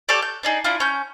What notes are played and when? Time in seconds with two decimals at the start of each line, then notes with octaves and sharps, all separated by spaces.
0.09 G4 A4 C#5 D5
0.22 G6
0.43 D4 D#4 G#4
0.64 D4 E4 F4
0.80 C#4 G6